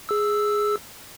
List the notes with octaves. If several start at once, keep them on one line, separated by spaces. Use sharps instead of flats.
G#4 E6